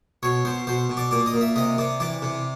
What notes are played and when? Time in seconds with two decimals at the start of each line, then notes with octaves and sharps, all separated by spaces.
0.23 B2 C#5
0.45 B2 C5
0.67 B2 C5
0.90 B2
0.97 D5
1.11 A#2 D5
1.26 D#5
1.34 A#2
1.41 E5
1.56 C3 D#5
1.78 C3 D5
2.00 E3 D5
2.22 C3